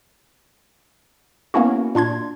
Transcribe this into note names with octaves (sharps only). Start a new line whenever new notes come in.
A#3 B3 C#4 E4 F#4
A#2 D4 C6 G#6